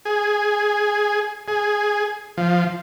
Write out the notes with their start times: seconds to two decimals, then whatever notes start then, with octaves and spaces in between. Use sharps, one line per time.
0.05 G#4
1.48 G#4
2.37 F3